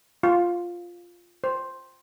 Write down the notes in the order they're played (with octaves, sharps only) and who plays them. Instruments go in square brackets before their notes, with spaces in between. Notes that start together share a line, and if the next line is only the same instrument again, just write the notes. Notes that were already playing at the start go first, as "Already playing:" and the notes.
[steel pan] F4
C5